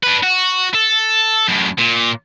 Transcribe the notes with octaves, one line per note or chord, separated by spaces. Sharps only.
D4 B4
F#4
A4
F#2 A2
A#2